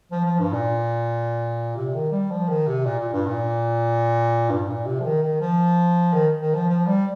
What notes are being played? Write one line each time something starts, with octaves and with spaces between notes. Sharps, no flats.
F3
F3
G2
A#2
C3
D#3
G3
F3
D#3
C3
A#2
A#2
G2
A#2
G2
A#2
C3
F3
D#3
D#3
F3
D#3
D#3
F3
F3
G3